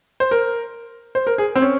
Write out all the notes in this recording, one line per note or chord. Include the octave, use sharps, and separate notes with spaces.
C5
A#4
C5
A#4
G#4
C4
C#4